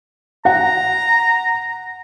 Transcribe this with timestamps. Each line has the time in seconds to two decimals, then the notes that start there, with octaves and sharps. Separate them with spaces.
0.45 F#5 A#5